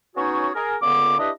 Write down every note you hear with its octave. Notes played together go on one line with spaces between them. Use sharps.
B3 C#4 D#4 F#4 G#4 C#5
G#4 A#4
C#2 A#2 D3 B3 D6
D4 E4 G4 B4 D#5